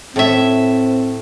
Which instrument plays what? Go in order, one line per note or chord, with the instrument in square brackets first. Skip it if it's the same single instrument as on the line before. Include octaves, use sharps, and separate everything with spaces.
[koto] A2 E5 [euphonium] C4